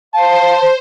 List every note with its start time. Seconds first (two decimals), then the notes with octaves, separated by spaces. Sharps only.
0.14 C5 F5 A5